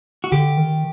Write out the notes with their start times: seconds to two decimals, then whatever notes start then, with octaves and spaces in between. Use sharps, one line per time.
0.24 F#4
0.32 D3 G4
0.57 D#3